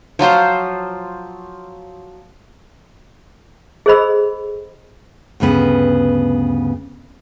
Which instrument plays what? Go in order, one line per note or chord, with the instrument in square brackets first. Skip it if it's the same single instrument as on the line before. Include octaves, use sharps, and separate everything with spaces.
[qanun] F3 F#3 F4 C5
[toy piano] G#4 A4 C5 D#5 B5 E6
[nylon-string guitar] D2 G2 C#3 B3 B4